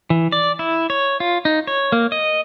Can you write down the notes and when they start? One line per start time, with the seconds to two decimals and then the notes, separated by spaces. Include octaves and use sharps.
0.10 E3
0.32 D5
0.59 E4
0.90 C#5
1.20 F4
1.45 D#4
1.67 C#5
1.92 A#3
2.12 D#5